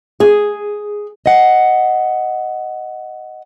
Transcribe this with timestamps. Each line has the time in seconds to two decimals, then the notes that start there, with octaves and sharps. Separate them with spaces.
0.20 G#4
1.26 D#5 F#5